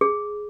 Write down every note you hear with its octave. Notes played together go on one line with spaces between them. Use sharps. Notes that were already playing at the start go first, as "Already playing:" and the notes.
G#4